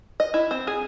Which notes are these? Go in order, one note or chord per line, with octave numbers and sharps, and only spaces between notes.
D#5
E4
C4
G#4